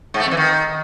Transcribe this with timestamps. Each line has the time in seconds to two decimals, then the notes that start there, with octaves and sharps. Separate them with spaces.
0.14 G#2
0.20 A3
0.26 F2
0.31 E3
0.37 D#3